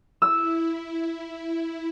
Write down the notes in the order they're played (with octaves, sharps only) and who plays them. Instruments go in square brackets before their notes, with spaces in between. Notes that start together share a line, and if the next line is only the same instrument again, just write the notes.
[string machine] E4 [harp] E6